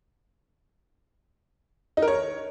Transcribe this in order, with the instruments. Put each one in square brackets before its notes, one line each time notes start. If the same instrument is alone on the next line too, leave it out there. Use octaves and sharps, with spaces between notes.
[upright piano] D#4
A#4
C#5